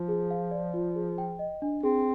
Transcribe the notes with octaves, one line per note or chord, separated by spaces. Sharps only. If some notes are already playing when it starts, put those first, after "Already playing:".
Already playing: F3 F4
G#4
F5
D5
F4
G#4
G5
D#5
D4
C4 G#4